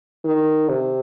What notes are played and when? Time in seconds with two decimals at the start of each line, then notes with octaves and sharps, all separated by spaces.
0.25 D#3
0.69 C3